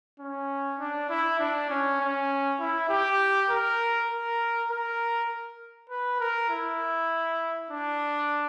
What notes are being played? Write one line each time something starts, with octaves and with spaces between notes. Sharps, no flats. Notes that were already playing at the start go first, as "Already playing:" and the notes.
C#4
D4
E4
D4
C#4
C#4
E4
G4
A#4
A#4
A#4
B4
A#4
E4
D4